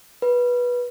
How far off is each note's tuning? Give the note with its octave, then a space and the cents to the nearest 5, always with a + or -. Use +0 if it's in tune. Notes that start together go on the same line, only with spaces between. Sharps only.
B4 -15